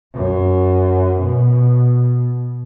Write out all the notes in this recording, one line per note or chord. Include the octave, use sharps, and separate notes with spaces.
F#2
B2